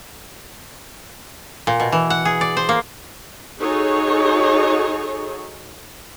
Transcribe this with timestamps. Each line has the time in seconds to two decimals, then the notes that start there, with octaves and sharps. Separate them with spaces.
1.67 A#2
1.80 B2
1.92 E3
2.10 F#5
2.25 G#4
2.41 D5
2.57 C5
2.69 A#3
3.58 D#4 F#4 G#4 A4 C#5